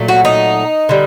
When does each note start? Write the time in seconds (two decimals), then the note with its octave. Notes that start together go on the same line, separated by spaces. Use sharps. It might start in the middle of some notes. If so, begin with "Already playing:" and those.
Already playing: A#2 F#3 A3
0.08 F#4
0.25 D#4
0.89 D3 G3